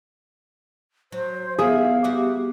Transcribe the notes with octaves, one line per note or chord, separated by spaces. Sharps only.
F#3 C5
E3 B3 E4 G#4 E5 F5
G3 F#4 G4